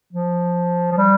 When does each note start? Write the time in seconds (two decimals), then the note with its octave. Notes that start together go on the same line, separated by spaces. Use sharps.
0.13 F3
0.92 F3
0.97 G3